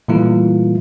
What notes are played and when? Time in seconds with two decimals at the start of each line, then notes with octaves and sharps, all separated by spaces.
0.08 A#2 E3 G3 A3 E4 F4